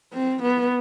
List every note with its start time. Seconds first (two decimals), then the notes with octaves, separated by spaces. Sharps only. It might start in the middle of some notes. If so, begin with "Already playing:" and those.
0.13 C4
0.43 B3